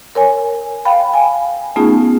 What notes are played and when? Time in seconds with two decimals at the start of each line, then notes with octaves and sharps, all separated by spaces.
0.15 A#4 C#5 G#5
0.85 F5 G5 B5
1.14 G#5
1.76 A3 B3 C#4 D#4 F4 G#4